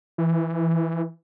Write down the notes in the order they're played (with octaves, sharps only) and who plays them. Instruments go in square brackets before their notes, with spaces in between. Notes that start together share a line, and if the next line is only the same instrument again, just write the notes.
[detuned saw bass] E3